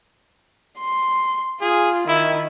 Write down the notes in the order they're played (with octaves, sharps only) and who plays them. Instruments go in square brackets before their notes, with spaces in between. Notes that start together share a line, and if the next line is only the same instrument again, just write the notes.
[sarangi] C6
[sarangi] F4 [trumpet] G#4
[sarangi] D#3 [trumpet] E4